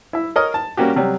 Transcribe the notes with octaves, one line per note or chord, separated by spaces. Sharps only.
E4 E5
A#4 C#5 D#5 A#5
A5
G3 A#3 C#4 F#4 G4
C3 F#3 G3